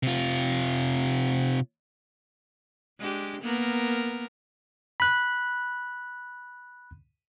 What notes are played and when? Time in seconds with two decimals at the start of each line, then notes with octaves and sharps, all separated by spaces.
0.03 C3 F4
2.99 G#3 D4 G4
3.42 A#3 B3 A#4
5.00 B5 F#6